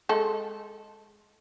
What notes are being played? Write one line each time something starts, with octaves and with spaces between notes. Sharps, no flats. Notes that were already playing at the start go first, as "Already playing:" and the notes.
G#3 A4